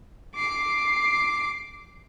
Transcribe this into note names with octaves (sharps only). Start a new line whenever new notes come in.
D6 C7